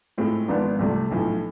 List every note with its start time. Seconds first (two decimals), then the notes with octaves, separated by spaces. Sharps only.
0.18 A2 G#3 C4 F4
0.48 G#1 G#2 F3 B3 D4
0.79 C2 C3 F3 A3
1.11 B1 A2 F3 A3